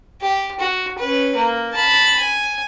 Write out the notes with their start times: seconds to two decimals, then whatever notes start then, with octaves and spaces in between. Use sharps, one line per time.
0.22 G4
0.60 F#4
0.98 C#4 B4
1.36 A#3
1.73 A5 B5
2.19 G#5